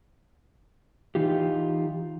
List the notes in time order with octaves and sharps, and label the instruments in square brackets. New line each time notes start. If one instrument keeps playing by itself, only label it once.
[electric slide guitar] E3 D#4 F4 G4